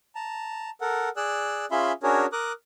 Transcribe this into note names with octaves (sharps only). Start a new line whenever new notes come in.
A5 A#5
A4 A#4 F#5
G#4 D5 E6 F#6
C#4 F4 G#4 E5 B5 C6
C#4 D4 F#4 G#4 A#4 C#5
A#4 D6 D#6 F#6